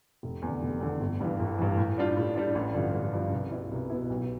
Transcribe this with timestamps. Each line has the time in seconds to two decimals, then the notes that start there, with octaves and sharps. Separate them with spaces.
0.23 F1
0.42 E2
0.48 D3
0.62 F1
0.81 E2 D3
1.01 G1
1.21 G2 E3
1.40 G1
1.59 G2 E3
1.77 A2
1.98 G3 D4 F4
2.17 A2
2.35 G3 D4 F4
2.55 A1
2.74 G2 D3 F3
2.94 A1
3.13 G2 D3 F3
3.32 C2
3.52 B2 B3 E4
3.72 C2
3.90 B2 B3 E4
4.10 B1